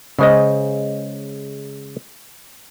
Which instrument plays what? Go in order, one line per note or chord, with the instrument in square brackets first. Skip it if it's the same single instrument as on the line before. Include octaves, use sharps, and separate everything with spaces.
[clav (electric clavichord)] C#3 G#3 [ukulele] G#4 C5 D#5